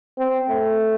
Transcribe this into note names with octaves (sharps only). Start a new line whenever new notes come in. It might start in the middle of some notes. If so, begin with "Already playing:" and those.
C4
A3